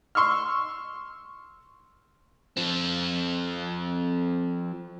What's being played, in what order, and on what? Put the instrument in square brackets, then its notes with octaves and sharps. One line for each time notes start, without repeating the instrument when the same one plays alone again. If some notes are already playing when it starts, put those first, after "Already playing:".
[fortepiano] C6 C#6 E6 F6
[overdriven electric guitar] F3 C4